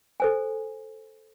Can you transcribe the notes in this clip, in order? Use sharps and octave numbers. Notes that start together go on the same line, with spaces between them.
A4 C5 G#5